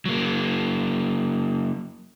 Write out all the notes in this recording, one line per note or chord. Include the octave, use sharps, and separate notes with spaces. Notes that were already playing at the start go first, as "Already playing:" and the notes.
F#3 A#3